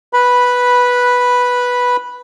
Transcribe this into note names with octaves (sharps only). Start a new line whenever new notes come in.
B4 B5